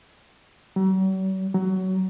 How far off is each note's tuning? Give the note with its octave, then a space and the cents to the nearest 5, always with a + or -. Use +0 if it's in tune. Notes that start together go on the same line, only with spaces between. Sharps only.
F#3 +45
F#3 +20